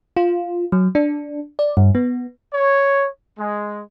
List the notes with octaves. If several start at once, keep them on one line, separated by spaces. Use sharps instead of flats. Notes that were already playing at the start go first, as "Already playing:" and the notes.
F4
F#3
D4
D5
G2
B3
C#5
G#3